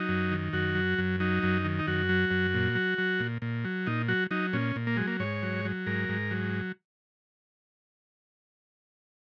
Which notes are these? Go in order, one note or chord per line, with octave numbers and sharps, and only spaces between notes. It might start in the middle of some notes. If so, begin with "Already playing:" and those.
Already playing: F#3 D#4
F#2
D#3
F#2 F#4
F#3
F#2
F#3 D#4
F#2
D#3
D#4
F#2 F#4
F#3
F#2
A#2
F#3
F#3
A#2
A#2
F#3
A#2 D#4
F#3 F#4
F#3 D#4
A#2 C#4
A#2
A#3
F#3 G#3
A#3
G#2 C#5
F#3
F#3
G#2 A#4
G#2
F#3